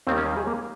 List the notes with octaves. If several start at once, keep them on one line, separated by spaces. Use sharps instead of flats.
D#2 D#3 G3 C4
C#4
G#4
A#3